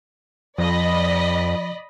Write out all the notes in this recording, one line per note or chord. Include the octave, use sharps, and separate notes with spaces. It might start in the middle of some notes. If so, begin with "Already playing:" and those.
F2 F3 D5 D#5 B5